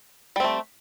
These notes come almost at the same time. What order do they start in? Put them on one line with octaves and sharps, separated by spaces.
G3 C4 A3